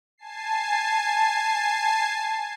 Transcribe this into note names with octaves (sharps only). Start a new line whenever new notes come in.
G#5 A5 C7